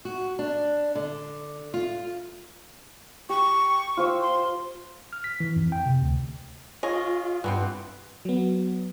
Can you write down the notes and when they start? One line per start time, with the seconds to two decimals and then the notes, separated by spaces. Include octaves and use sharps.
0.05 F#4
0.39 D4
0.95 D3
1.74 F4
3.29 G4 C#6
3.97 F4 C5 E6
4.22 C6
5.13 F6
5.24 B6
5.40 E3
5.56 F2
5.72 G5
5.86 C3
6.02 D2
6.83 F4 G#4 C#5 D#5
7.44 G2 E3 B3 C4
8.25 F#3 B3